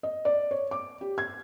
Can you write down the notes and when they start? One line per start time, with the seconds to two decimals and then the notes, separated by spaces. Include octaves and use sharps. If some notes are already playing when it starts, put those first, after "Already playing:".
0.03 D#5
0.25 D5
0.51 C#5
0.71 D6
1.01 G4
1.18 G#6